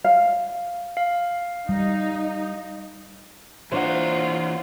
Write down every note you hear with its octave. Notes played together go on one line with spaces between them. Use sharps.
F5
F5
G3 D#4
E3 A#3 D4 F4 C5 C#5 F#5 A#5